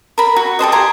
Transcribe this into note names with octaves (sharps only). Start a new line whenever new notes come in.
A#4 B5
F#4
G4 A4 C5 D#5
G4 G#5 A#5 C6